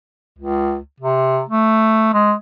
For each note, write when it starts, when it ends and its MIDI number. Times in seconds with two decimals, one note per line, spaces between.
0.38 0.78 37
1.00 1.41 48
1.49 2.11 57
2.14 2.34 56